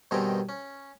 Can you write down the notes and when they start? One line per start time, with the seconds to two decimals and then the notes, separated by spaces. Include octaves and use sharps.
0.11 G2 B2 D#3 C4 G#4 A#5
0.49 C#4